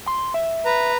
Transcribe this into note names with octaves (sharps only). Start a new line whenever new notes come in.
C6
E5
B4 A#5